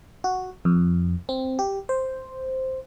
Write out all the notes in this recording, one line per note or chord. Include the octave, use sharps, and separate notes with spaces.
F#4
F2
C4
G4
C5